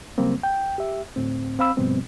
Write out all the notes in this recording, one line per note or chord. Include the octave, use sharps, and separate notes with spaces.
C#3 F#3 G3 A#3 C4
G5
G4 E5
D2 A2 C4
C4 F5 B5 E6
G2 B2 F3 G3 B3 C4